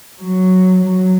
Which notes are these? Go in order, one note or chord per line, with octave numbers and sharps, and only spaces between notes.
F#3
F#3